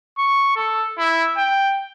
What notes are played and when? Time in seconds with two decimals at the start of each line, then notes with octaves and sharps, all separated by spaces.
0.18 C#6
0.56 A4
0.98 E4
1.37 G5